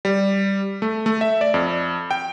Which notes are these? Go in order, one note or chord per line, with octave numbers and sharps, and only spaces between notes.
G3
A3
A3
E5
D5
F2
G5